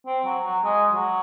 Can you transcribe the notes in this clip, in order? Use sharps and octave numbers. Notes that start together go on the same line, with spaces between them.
C4
F#3
F#3
G#3
F#3